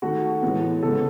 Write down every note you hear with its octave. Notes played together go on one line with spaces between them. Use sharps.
D#3 A3 F#4
A2 E3 G#3 B3
C#3 G#3 B3 A4